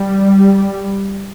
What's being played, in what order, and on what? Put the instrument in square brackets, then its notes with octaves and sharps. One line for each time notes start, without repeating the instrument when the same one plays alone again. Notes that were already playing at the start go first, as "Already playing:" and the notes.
Already playing: [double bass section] G3